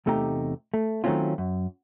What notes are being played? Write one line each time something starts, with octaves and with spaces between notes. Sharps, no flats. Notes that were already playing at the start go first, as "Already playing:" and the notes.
E2 C3 A3 D#4 G4 A#5
A3
D#3 F#3 A3 C4 C#4 F4
F#2